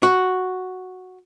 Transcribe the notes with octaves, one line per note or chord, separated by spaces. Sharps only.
F#4